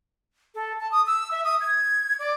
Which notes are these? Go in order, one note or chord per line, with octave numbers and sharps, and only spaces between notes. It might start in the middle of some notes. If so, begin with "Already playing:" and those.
A4
A5
D#6
E6
E5
D#6
G#6
D5